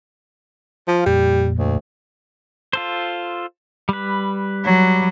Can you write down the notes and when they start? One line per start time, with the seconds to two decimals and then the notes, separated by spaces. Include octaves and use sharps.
0.88 F3 F5
1.06 F2 A#2 G3
1.58 D2
2.73 F4 A4 C5
3.89 G3 B4
4.64 F#3